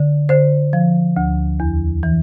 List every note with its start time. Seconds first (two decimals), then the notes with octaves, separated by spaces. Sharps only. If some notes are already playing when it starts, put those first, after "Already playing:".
Already playing: D3
0.29 D3 C5
0.73 F3
1.17 D2
1.60 E2
2.03 E3